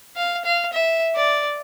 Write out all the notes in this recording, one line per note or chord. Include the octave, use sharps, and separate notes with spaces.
F5
F5
E5
D5